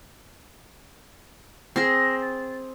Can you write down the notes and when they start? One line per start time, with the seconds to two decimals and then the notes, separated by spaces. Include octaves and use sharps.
1.76 C4 G#4 A#6
2.22 A6